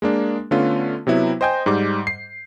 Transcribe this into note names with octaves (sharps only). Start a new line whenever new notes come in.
G#3 A#3 D4
D3 A3 B3 C#4 F4
C3 F#3 B3 E4
C5 D#5 G5 G#5 G6
G#2 G3 D6
C7